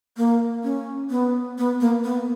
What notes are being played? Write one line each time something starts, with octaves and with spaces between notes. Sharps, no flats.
A#3
C#4
B3
B3
A#3
B3